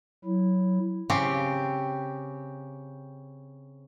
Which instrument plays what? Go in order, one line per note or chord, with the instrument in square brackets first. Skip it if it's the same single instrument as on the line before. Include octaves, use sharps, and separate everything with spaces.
[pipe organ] F#3 E4
[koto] C#3 C4 G4